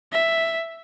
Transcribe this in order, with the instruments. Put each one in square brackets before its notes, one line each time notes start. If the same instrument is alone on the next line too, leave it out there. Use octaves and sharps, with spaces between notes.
[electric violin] E5